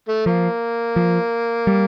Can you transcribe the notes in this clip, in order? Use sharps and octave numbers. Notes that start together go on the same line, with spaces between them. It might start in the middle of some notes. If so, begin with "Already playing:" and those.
A3
F3 A#3
F3
G3